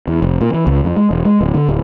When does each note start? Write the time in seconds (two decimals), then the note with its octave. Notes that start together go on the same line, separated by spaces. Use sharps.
0.08 E2
0.22 F1
0.41 A#2
0.54 E3
0.67 C#2
0.84 F2
0.96 G#3
1.11 E1
1.25 G#3
1.41 D1
1.54 D3
1.68 D1